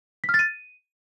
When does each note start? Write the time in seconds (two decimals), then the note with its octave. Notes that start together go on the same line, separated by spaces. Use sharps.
0.24 B6
0.29 F6
0.34 A6
0.39 D#7